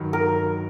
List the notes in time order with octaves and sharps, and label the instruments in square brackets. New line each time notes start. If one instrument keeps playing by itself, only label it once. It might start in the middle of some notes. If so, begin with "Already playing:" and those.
Already playing: [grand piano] G2 D#3 F#3
[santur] A#4